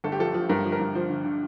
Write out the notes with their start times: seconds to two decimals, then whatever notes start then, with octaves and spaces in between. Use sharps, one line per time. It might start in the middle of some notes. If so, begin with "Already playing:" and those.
0.04 G1 A4
0.12 G4
0.19 F3 A4
0.34 F3
0.49 G2 A#4
0.65 F3
0.72 A#4
0.79 G2
0.95 F3 C5
1.10 D3
1.25 D3